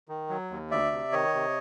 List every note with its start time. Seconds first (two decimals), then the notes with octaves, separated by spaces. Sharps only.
0.09 D#3
0.30 F#3
0.50 D#2
0.71 D2 D5 E5
0.92 C3
1.12 D#3 C#5 D#5
1.33 C3